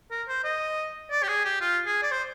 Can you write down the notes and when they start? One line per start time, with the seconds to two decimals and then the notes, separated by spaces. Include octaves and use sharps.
0.11 A#4
0.28 C5
0.44 D#5
1.11 D5
1.23 G4
1.28 G#4
1.45 G4
1.61 F4
1.86 G#4
2.03 D5
2.11 C5